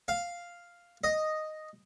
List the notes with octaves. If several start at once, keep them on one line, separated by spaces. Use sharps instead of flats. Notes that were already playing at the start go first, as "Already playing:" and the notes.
F5
D#5